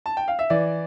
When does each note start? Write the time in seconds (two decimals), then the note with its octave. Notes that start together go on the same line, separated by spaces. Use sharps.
0.06 A5
0.17 G5
0.28 F5
0.39 E5
0.50 E3 D5